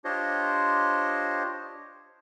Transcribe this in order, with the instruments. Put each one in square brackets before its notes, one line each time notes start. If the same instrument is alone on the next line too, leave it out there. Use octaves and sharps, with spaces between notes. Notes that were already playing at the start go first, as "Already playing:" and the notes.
[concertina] D4 F4 G4 C5 C#5 D#5